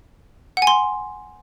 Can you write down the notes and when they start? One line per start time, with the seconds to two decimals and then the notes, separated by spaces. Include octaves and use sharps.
0.57 F#5
0.62 G#5
0.67 C6